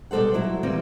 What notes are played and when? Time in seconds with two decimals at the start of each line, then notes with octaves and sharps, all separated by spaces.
0.11 B2 G3 A4 C5 F#5
0.34 F#3 E4
0.63 E3 G3 A#3 C4